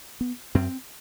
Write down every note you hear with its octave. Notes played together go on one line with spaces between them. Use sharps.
B3
F#2 C4